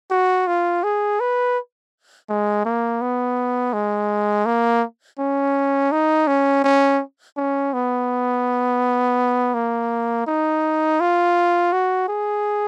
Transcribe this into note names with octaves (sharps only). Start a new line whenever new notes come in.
F#4
F4
G#4
B4
G#3
A#3
B3
G#3
A#3
C#4
D#4
C#4
C#4
C#4
B3
A#3
D#4
F4
F#4
G#4